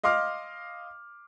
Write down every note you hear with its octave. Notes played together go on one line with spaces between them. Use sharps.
D#5 F5 C6 D6 F6